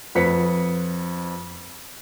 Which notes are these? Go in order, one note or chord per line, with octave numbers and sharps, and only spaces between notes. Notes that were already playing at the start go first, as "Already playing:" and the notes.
F2 B4 B6 C#7